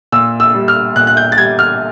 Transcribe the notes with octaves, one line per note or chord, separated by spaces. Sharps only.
A#2 E6
E6
G3
F6
A#2 F#6
F#6
G6
A6
G3 G#6
F6